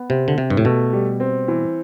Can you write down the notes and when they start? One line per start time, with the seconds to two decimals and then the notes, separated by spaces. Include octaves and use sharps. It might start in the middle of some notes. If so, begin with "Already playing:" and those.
Already playing: B3
0.10 C3 C4
0.28 D3
0.38 C3 G4
0.50 G2
0.57 A2
0.65 B2 A3
0.93 G3
1.20 C4
1.48 E3